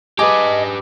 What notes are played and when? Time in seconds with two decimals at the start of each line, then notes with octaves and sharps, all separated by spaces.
0.19 G4 G#4 B4 D#5 D6